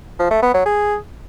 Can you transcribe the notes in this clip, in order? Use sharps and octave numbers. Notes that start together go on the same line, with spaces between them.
F3
A3
B3
F#3
G#4